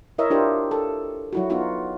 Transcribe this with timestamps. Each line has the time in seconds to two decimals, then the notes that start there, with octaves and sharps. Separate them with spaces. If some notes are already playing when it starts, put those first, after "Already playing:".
0.18 E4 A#4 C#5 D#5 E5
0.30 D4 E4 F4 G4 A#4 C5
0.71 A4
1.33 F#3 E4 F#4
1.50 B3 D#4 F4 F#4